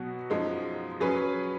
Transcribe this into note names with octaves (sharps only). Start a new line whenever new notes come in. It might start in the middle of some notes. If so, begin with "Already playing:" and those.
Already playing: B2 F#3 B3 F#4
F#2 F3 G#3 D#4
F#3 C#4 G#4 B4